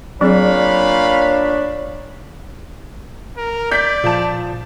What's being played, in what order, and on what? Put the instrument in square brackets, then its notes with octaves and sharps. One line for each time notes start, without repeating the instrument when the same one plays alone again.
[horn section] A#2 F5 B5 [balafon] F#3 C4 G#4 [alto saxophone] D4 [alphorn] C#5
[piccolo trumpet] A#4
[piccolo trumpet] D5 [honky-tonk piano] G6 B6
[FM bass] A#2 [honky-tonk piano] F3 A5